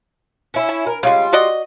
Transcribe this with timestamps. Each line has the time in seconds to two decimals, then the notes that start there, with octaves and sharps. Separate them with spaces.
0.54 C#4 E4
0.69 G#5
0.87 A#4
1.03 C#3 G3 G#3 F4
1.33 F#4 D5 D#5